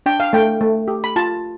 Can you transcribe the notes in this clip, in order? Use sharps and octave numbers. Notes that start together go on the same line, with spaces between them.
D4 G5
F5
A3 G5
A3
G4
B5
F4 A5